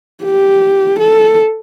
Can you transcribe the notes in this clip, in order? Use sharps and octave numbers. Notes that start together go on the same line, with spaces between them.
G4
A4